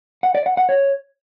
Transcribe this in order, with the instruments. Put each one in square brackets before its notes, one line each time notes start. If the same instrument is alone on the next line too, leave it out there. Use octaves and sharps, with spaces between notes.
[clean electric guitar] F#5
D5
F#5
F#5
C#5